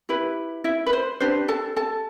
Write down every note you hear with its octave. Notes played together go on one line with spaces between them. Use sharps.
E4 G4 B4
E4 E5
B4
C5
D4 G4 B4 C5
A4 A5
A4 A5